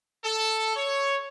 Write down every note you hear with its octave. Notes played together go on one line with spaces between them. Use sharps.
A4
C#5